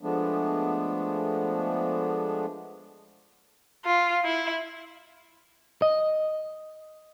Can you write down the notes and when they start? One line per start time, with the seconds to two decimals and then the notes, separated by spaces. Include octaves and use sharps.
0.01 F3 G#3 A3 B3 D4
3.85 F4
4.24 E4
5.82 D#5